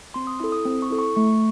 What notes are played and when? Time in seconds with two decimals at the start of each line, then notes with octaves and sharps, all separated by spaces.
0.14 C4 C6
0.27 D#6
0.40 E4 A4 D#6
0.52 D#6
0.65 C4 D#6
0.82 C#6
0.90 E4 A4
0.99 C#6
1.16 A3 C#6